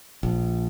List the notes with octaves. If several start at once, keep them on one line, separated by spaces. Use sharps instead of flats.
A#1